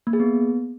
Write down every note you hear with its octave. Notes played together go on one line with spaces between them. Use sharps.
A#3
G#4
B3